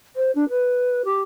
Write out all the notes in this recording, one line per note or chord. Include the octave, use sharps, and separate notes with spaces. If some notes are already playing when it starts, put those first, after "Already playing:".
C5
D4
B4
G4